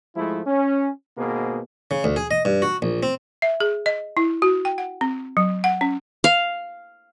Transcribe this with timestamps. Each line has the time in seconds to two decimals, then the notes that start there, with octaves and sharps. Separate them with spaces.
0.16 G#2 F3 G#3 A3 E4
0.47 C#4
1.18 G#1 B2 A#3 B3 G#4 C5
1.91 C#3
2.04 D2
2.16 G#4
2.31 D#5
2.45 G2
2.62 F#4
2.82 A#1
3.03 C4
3.42 E5
3.60 G#4
3.86 D#5
4.17 E4
4.42 F#4
4.65 G5
4.78 F#5
5.01 C4
5.37 F#3
5.64 F#5
5.81 C#4
6.24 F5